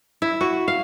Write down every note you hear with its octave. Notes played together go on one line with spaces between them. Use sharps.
E4
F#4
F5